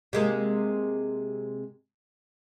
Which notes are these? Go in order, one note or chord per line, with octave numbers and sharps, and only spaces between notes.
C3 G#3 A#3